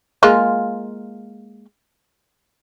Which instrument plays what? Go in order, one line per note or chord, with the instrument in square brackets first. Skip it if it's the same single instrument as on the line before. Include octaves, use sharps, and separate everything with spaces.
[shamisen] G#3 A#3 F4